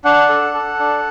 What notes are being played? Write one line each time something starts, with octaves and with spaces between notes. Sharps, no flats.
D4 F#5
A4
A4
D4